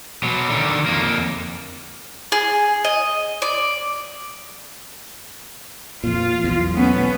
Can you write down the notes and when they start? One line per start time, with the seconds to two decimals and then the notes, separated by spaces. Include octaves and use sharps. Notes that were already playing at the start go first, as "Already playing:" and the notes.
0.23 B2 F#3
0.50 D3 D#3
0.86 F2 A#3
2.32 G#4
2.84 D#5
3.42 D5
6.04 F2 A#2 F4
6.44 B1 E2
6.76 A3 B3 C#4